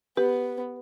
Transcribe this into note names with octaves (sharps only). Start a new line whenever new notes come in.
B3 G4 B4